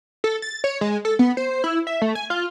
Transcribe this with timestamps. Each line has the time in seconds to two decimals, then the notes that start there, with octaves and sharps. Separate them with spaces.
0.24 A4
0.42 A6
0.64 C#5
0.81 G#3
1.05 A4
1.19 B3
1.37 C5
1.64 E4
1.87 E5
2.02 A3
2.15 G#5
2.30 F4